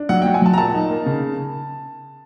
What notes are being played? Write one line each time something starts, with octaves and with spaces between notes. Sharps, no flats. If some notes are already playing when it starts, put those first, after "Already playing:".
Already playing: D4
F#3 F#5
F#3 G5
G#5
F#3 A5
A#5
A#2 A5
D#4
A#3
C#3